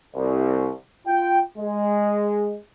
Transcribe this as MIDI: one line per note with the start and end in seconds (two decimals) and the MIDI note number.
0.15 0.71 36
1.06 1.41 65
1.06 1.41 79
1.59 2.58 56